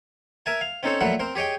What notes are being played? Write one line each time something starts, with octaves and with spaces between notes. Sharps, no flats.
A#4 E5 G#5 A5
F5
C4 C#4 D#4 A4 C5 C#5
A#2 F3 F#3 A3 F#5 B5
C4 A#4 C5
G4 G#4 C#5 D#5 G5